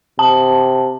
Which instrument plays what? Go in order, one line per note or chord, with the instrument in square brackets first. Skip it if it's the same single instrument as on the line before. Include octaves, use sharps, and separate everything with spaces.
[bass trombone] C3 [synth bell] A5